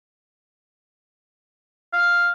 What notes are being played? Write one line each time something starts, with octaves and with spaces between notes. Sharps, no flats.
F5